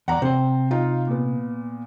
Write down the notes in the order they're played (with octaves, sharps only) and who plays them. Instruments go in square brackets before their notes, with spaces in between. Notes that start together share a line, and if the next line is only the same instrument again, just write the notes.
[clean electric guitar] E2 D5 [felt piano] F#5 A#5
[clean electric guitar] C3 C5 [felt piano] C4
[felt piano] D#4 F4 F5
A#2 B3